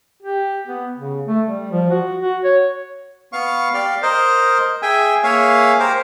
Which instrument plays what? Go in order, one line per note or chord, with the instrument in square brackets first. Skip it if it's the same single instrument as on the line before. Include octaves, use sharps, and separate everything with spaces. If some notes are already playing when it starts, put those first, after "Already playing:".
[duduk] G4
B3
C#3
A3
G3
F3
F#4
F#4
C#5
[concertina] B3 F5 C#6
G4 D5 F5
A#4 C5 D#5
G#4 E5 G5 G#5
A#3 G#4 C#5 E5 F5 G#5
G4 A#4 C5